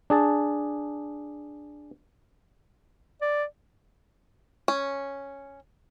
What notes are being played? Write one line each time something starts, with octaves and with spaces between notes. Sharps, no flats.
D4 G#4 A5
D5
C#4